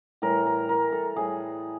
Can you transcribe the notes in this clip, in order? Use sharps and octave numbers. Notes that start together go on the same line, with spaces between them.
A2 E3 G3 A#4
A#4
A#4
A4
A2 E3 G3 G#4